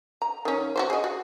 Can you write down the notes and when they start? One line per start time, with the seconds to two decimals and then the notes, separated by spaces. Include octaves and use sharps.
0.22 A#5
0.45 D#3 C#4
0.76 F#4 G4 C5
0.90 G#4 D#5
1.04 F#4